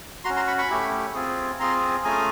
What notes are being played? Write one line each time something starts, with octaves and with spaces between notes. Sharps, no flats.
C#4 F#4 A#5 C6
A#5 C6
B5 C#6
B5 C#6
A3 C#4 E4 G4
C4 F4 G#4
C4 F4 G#4 A#5 C6
A3 C#4 F4 G#4 G#5 A#5